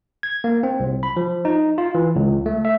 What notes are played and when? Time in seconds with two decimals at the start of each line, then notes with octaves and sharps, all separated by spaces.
0.23 G#6
0.44 A#3
0.63 C4
0.80 C2
1.03 B5
1.16 F3
1.45 D#4
1.78 F4
1.95 E3
2.16 C#2
2.46 A3
2.65 E5